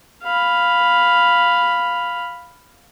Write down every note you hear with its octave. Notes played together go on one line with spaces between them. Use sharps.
F5 B5